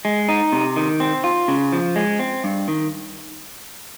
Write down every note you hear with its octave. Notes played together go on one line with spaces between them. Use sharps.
G#3
D#4
C3
D#3
C4
F4
C#3
F3
G#3
C4
G2
D#3